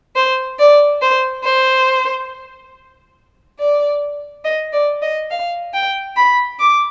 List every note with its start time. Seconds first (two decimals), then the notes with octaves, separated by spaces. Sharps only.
0.16 C5
0.59 D5
1.02 C5
1.44 C5
3.59 D5
4.45 D#5
4.73 D5
5.02 D#5
5.31 F5
5.74 G5
6.16 B5
6.59 D6